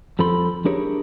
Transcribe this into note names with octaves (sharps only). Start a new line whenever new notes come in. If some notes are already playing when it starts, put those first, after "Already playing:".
F2 F3 A4 B5 C6
D4 E4 G4 G#4 A#4 C#5